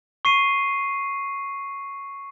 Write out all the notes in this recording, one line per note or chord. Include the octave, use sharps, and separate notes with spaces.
C#6 C7 D#7